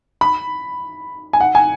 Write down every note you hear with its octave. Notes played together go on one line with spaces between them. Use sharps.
B5
G#5
F#5
G#5